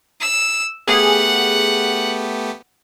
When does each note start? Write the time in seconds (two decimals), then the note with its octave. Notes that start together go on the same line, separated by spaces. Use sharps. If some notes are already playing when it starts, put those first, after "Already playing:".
0.20 E6
0.88 A3 B3 G4 G#4 F#5